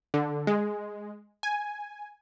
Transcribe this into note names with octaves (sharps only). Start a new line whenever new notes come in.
D3
G#3
G#5